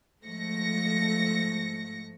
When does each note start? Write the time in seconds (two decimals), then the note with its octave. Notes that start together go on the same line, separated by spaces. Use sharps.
0.22 G#2 F3 A3 A#6 C#7